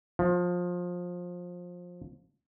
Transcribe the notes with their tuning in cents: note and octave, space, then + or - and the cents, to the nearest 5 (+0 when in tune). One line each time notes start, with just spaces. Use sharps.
F3 +20